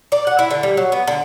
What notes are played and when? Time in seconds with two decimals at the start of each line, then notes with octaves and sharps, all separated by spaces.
0.12 D5
0.27 F#5
0.39 E4
0.51 D3
0.63 G3
0.77 F#3
0.92 B3
1.07 D3